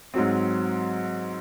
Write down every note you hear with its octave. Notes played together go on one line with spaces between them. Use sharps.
G#2 F#3 C4